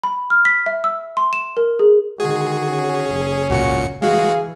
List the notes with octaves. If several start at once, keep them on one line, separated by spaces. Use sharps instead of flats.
B5
F6
B6
E5
E6
C6
E7
A#4
G#4
D3 D#3 G#3 F#4 G#4
C#4
F#1
C#2 A#2 F#4 C#7
E3 G#3 F#4 G#4 F5